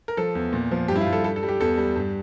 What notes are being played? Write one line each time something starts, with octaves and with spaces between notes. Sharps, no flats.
A#4
F3 A4
E2
A#2
F3
G2 G4
E4
F4
G2
A4
G3 A4
A4
G3
G4
E2 A4
G3
G2